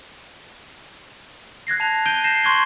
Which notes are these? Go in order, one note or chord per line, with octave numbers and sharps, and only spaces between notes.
F#6 G#6 A#6 C7
A5 F#6 F7
F#6 G6 D7 D#7 G7
G6 A#6 C7 E7
C6 C#6 F#6 G#6 G7